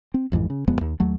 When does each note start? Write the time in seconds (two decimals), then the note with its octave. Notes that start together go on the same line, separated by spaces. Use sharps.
0.14 C4
0.32 A1 F2 G#2 E3
0.50 C#3
0.67 D#1 F2 G#3 B3
0.81 D#2
1.00 D#2 F#3 A3